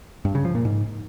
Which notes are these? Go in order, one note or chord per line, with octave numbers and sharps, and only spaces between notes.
G2
C#3
F3
A#2
G#2